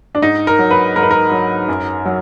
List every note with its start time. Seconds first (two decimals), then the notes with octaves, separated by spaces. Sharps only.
0.15 D4
0.22 G#2 D#4
0.47 A#4
0.59 F#3
0.71 B4
0.96 G#2 A#4
1.03 B4
1.11 A#4
1.32 F#3
1.68 F#2
2.05 F#3